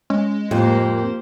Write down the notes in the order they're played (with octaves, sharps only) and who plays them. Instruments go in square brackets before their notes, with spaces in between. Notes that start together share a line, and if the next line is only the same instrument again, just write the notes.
[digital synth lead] G#3 [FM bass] C#4
[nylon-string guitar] F2 [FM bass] A2 [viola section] A#3 G4 C5